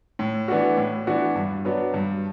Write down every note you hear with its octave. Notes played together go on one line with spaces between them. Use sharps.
A2
E3 B3 D4 F#4
A2
E3 B3 D4 F#4
G2
F#3 B3 D4
G2